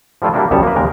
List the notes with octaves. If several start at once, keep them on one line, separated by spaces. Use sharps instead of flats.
F3 G3 A3 E4 F4
G3 A#3 D4 E4 F#4
C2 F#2 G3 B3 C#5 A5
A#3 B4
D#2 C#3 G3 G#3 A#4